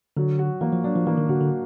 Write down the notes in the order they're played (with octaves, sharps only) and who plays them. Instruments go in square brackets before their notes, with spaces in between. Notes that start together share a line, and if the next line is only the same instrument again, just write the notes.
[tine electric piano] D3 [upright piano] F#3
[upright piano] F#4
[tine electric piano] E3 [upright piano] A#3
[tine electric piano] F3
[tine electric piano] F#3 [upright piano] D4
[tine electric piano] F3
[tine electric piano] E3 [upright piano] A#3
[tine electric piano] D#3
[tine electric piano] D3 [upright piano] F#4
[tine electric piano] D3